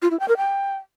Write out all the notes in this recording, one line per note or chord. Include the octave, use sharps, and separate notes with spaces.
F4
E4
G5
A#4
G5